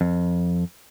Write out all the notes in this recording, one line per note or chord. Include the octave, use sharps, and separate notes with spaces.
F2